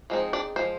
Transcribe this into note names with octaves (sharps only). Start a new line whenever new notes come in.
F3 G#3 C4 D#4
D4 D5
F3 G#3 C5